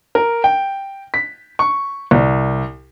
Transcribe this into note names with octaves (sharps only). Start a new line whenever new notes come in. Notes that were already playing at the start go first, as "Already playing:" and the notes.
A#4
G5
B6
C#6
C2